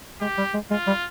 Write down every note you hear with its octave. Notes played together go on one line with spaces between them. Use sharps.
G#3 G4
G3
G#3
G#3 F4
G3